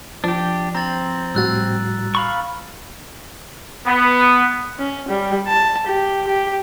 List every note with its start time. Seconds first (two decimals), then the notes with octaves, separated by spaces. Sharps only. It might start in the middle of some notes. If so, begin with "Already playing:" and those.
0.24 F3 D4 G4
0.75 C4 A#5 A6 F#7
1.35 A2 G3 F#4 E6 F#6 A6
2.15 F5 B5 C#6
3.87 B3
4.79 C#4
5.09 G3
5.48 A5
5.87 G4
6.28 G4